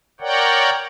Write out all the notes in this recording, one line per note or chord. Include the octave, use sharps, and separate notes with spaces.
A#4 C#5 D5 F#5 G5